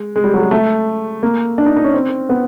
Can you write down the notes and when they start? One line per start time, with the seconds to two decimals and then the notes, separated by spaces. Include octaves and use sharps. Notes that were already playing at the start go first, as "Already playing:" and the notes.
Already playing: G#3
0.16 G#3
0.24 G3
0.34 F#3
0.42 G#3
0.51 A3
1.23 A#3
1.58 D4
1.66 D#4
1.76 D#4
1.84 C#4
1.94 C4
2.29 B3